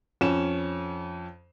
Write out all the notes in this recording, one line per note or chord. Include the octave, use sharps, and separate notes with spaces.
F2 C#4 E7